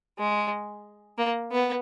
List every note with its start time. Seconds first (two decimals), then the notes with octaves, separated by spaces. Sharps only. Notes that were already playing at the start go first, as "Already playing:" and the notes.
0.18 G#3
1.18 A#3
1.52 B3